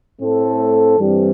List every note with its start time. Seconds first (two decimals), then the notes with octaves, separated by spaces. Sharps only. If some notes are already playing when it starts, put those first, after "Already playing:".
0.21 A2 A3 C4 A4
0.98 G2 E3 G3 C4